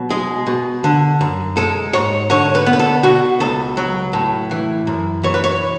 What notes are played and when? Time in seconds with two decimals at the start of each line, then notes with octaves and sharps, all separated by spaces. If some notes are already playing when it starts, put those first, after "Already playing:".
Already playing: B2 F#3
0.10 G#3 G#4
0.47 B2
0.84 D3
1.21 F#2
1.57 G#3 A4
1.93 G#2 C#5
2.30 D3 C#5
2.55 B4
2.66 B3
2.73 B4
2.79 A4
3.03 B2 F#4
3.40 C#2 A4
3.77 F#3
4.13 A2
4.51 E3
4.87 F#2
5.23 E3 C#5
5.34 B4
5.44 C#5